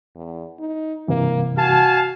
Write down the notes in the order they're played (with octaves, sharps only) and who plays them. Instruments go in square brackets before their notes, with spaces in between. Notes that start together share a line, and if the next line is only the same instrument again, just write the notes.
[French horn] E2
D#4
[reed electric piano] G2 C3 E3 [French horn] A#3
[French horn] F#4 [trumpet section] F5 G#5 A5